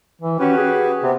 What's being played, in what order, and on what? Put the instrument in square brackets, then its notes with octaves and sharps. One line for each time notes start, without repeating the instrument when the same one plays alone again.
[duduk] E3
[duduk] C#4 [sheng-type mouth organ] F#4 G4 B4
[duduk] G#4
[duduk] C3 [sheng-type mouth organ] B3 C4